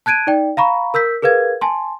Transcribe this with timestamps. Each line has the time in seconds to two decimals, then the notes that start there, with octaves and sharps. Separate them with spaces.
0.06 A5 F#6 G#6 D7 D#7
0.27 D#4 D5 G5
0.57 F5 A#5 B5 C#6
0.94 A#4 E6 G6 B6
1.22 G#4 A#4 B4 F5 G#6
1.61 G#5 A5 C6